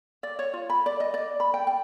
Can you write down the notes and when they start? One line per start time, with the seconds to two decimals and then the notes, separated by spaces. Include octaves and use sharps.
0.23 D5
0.39 C#5
0.54 F4
0.70 B5
0.86 D5
1.00 D#5
1.14 D5
1.40 B5
1.54 G5
1.67 G5